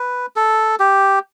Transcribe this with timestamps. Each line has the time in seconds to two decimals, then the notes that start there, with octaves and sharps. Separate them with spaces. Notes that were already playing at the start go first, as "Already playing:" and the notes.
Already playing: B4
0.36 A4
0.80 G4